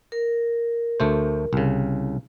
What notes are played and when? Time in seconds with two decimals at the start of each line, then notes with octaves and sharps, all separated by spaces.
0.12 A#4
1.00 D2 A3 C5
1.53 C2 C#3